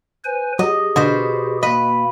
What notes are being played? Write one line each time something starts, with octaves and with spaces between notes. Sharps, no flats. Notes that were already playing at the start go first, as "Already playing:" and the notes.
B4 C5 G#5
F#3 G4 G#4 D#5
B2 D3 C5 D#5
A#3 B4 D#5